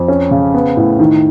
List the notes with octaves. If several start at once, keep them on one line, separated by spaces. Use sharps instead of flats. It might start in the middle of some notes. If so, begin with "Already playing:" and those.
Already playing: F2
C#4
C#3
B3
A2
D#3